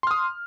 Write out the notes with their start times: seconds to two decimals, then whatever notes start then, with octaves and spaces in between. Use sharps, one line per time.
0.03 C6
0.07 F6
0.11 D#6